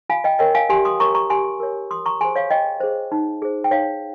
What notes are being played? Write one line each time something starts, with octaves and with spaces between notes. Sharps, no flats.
F4 F5 G#5
D#5 G5
A#4 C#5 D#5 G5
F5 G#5
G4 G#5 C6
C6 D#6
A#4 C#5 A#5 C#6
A#5 C#6
G4 G#5 C6
A#4 C#5
F4 C6 D#6
A#5 C#6
G#4 C5 G#5 C6
C#5 F5
F4 D#5 G5
G#4 C5
D#4
G#4 C5
G5
D#4 C#5 F5